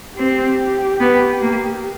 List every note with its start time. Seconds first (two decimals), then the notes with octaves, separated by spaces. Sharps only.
0.17 C4 G4
1.00 B3
1.42 A#3